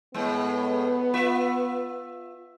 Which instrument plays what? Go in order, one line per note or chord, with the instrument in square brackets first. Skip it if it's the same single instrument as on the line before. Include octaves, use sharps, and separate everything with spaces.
[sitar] A2 G#3 [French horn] B3
[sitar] F4 E5